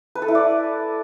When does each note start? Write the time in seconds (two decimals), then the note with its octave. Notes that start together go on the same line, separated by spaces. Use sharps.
0.15 B4
0.22 A4
0.28 E4
0.35 D5